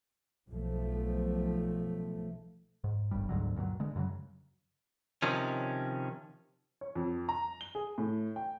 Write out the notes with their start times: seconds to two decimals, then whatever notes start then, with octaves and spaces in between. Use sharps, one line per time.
0.50 B1 F3 A3
2.84 G#2
3.11 D1 G1 G2 G3
3.29 D2 G#2 D3 F#3
3.56 G2 A#2 F3 F#3
3.80 D3 G#3
3.96 F#2 C#3 E3 F#3
5.22 C3 D#3 F3 C#4
6.81 C#5
6.95 F2
7.29 A#5
7.61 G7
7.75 G#4
7.98 A2
8.36 G5